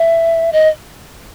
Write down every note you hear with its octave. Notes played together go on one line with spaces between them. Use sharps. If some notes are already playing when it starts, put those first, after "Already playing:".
Already playing: E5
D#5